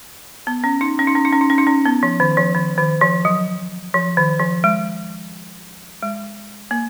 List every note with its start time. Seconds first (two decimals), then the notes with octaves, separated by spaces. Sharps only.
0.47 B3
0.64 C#4
0.81 D#4
0.99 C#4
1.07 D#4
1.15 C#4
1.25 D#4
1.33 C#4
1.41 D#4
1.50 C#4
1.58 D#4
1.67 C#4
1.85 B3
2.03 F3
2.20 D#3
2.37 F3
2.55 D#3
2.78 D#3
3.01 F3
3.25 F#3
3.94 F3
4.17 D#3
4.39 F3
4.64 G#3
6.03 G#3
6.71 A#3